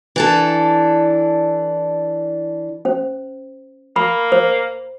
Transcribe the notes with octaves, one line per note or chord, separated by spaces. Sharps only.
E3 D4 A4
C#4 C5
A#3 B5
C5